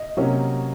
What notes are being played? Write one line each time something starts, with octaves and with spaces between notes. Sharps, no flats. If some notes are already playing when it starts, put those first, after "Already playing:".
Already playing: D#5
C3 F#3 A#3 C#4